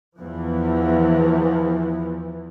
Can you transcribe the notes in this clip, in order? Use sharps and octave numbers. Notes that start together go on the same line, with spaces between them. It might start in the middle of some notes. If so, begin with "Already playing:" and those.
E2 E3 F3